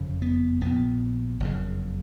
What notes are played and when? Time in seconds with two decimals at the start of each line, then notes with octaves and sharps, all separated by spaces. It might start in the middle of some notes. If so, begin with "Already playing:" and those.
Already playing: F#1 F2 C#3
0.22 B3
0.61 A#1 A#2 B3
1.40 F#1 F2 C#3